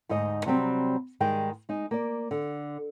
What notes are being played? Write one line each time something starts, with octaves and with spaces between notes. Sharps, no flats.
D2 G#2 D#4 D#5
C3 F#3 G3 C4
G#2 D#3 G3 G#3 G5
G#3 D#4
A#3 D5
D3